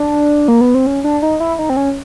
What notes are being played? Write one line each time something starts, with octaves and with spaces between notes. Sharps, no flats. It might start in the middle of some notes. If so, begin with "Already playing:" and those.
Already playing: D4
A#3
B3
C4
C#4
D4
D#4
E4
D#4
C4
C#4